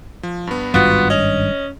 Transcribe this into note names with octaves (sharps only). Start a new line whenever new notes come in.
F3
G2 B3
G#1 G2 G3 B3 F4 F#4
C#4 D#5